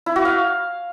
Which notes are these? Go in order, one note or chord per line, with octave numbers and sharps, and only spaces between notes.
E4
F#4
F5